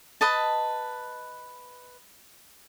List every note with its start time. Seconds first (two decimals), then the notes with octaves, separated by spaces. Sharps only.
0.21 B4 D#5 A5